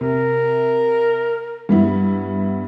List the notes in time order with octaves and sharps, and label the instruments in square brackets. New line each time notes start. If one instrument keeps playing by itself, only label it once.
[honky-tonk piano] C3 [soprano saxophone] A#4
[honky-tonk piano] G2 B3 E4